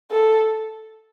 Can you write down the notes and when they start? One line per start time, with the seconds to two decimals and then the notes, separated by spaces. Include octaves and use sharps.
0.11 A4